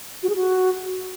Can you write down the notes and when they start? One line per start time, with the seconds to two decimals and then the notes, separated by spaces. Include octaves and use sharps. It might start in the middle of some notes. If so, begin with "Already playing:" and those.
0.23 F#4
0.29 G#4
0.36 F#4